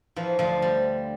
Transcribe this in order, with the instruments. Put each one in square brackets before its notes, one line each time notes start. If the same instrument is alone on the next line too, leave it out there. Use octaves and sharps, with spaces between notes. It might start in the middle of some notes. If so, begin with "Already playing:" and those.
[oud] E2 E3 [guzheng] F3
[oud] D2 D3 [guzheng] F3
[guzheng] G3